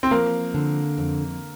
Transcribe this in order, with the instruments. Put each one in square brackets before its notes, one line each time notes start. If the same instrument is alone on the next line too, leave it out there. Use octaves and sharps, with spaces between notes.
[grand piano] C4
[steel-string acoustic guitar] F3 [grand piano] A#3
[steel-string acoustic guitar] D3
F2